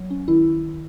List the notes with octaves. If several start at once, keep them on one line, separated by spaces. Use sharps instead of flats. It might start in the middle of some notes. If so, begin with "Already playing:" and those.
Already playing: F#3
C#4
D#3 E4